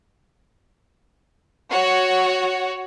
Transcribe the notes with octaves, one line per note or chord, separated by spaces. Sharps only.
F#4 C#5